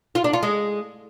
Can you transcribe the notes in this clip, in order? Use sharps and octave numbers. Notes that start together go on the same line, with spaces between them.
F4
D4
F4
G#3